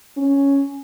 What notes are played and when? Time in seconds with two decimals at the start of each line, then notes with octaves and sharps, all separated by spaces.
0.17 C#4